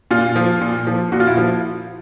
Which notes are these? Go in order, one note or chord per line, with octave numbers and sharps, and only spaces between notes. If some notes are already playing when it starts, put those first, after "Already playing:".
A#2 F4
F3
A#2
F3
A#2 F#4
F4
E4
F3 F4